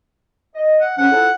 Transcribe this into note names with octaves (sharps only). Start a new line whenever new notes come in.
D#5
F#5
C#3 F3 C#4 F#5
F3 E4 A4